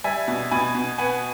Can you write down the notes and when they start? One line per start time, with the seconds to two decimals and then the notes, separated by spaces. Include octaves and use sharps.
0.04 G3 E5 G#5
0.28 B2
0.51 B2 G#5 B5
0.75 B2
0.98 B3 G#5 B5